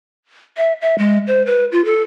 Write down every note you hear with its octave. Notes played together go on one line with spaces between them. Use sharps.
E5
E5
G#3
C5
B4
F4
A4